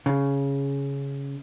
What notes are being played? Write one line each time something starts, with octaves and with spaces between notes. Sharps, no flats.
C#3